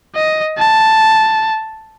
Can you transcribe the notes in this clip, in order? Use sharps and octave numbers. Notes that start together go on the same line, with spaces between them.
D#5
A5